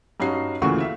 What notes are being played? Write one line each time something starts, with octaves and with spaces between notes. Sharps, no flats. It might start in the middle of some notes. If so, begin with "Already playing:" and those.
G2 C#4 D#4 F#4 C7
D2 A#2 C#3 E3 F#4 C#6
E5 F5